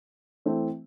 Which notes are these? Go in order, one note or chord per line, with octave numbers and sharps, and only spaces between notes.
E3 A3 C4